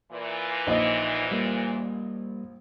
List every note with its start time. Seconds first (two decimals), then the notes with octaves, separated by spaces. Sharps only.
0.12 A#2 E3
0.67 A#1 D#4 D#5
1.31 G3 A#3